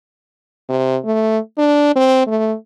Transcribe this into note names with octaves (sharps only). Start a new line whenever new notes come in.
C3
A3
D4
C4
A3